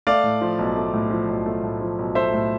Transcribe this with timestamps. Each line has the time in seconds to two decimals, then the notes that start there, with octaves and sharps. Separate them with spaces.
0.07 A3 D5 F5
0.24 A2
0.41 F3
0.59 B1
0.76 A3
0.94 A2
1.11 F3
1.28 B1
1.46 A3
1.63 A2
1.81 F3
1.99 B1
2.15 A3 C5 E5
2.33 A2